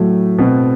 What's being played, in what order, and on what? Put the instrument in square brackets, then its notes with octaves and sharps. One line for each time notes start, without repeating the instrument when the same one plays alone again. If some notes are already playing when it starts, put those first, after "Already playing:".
Already playing: [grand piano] A2 A3 [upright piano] F#3
[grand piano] B2 B3 [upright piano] C4